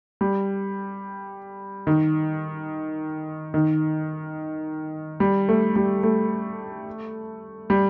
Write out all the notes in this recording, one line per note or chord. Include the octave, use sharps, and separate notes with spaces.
G3
D#3
D#3
G3
A3
G3
A3
G3